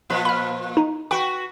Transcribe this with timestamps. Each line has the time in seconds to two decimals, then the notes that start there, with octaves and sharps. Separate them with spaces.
0.10 A#2 F3 B4
0.25 B5 F6
0.77 D#4
1.11 F#4 B4 G5 C#6